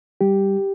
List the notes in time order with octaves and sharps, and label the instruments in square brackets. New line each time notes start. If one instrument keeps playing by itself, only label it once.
[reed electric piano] G3 G4